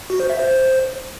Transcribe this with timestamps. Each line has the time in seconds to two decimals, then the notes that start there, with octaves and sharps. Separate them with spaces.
0.10 F#4
0.20 C5
0.30 E5
0.39 C5